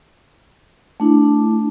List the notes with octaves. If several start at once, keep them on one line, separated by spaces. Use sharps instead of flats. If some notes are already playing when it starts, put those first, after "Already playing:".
A3 D4 E4